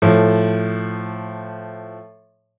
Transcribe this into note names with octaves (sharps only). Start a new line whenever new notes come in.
A2 F3